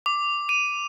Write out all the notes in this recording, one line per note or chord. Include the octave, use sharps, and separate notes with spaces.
D6
D#7